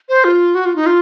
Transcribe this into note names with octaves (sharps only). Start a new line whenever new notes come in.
C5
F4
F#4
F4
D#4
F4